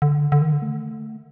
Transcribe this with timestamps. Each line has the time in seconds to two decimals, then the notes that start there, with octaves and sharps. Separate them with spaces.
0.02 D3
0.32 D3
0.42 D#3
0.52 D3
0.62 A3